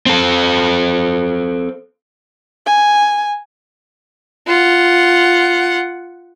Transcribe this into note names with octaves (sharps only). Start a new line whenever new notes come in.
C4 A4
G#5
F4 F#5